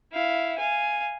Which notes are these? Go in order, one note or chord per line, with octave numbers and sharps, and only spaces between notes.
E4 F5
F5 G#5